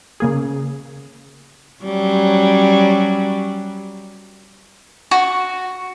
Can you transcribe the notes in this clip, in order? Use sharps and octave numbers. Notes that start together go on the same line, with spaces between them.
C#3 A#3 G#4
F#3 G3 C#4
F#4